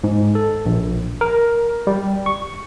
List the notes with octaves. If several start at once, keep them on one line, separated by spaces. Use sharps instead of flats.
G#2
A4
A#1
A#4
G3
C#6